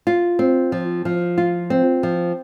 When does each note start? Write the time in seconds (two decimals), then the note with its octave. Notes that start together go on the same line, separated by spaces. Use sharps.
0.07 F4
0.39 C4
0.72 F3
1.05 F3
1.38 F4
1.70 C4
2.03 F3